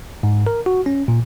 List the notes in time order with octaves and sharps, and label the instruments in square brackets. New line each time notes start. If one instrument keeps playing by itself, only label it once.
[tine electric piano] G#2
A#4
F#4
C#4
A#2